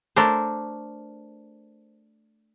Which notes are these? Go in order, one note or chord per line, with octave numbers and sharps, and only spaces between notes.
A3 D4 A#4 C5